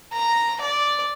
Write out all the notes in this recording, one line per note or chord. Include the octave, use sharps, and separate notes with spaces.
A#5
D5